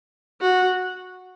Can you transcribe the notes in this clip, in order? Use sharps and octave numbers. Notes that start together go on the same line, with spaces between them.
F#4